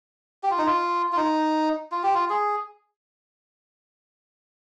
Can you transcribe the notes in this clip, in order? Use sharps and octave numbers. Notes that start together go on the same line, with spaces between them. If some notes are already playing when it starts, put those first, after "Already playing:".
G4
F4
D#4
F4
F4
D#4
F4
G4
F4
G#4